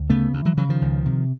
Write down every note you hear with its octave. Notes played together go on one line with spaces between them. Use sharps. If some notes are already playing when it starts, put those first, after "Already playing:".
Already playing: D2
C#3 A3 B3
D2
E3 F#3
C#3 E3 F#3
D#3 F3
C#2
C3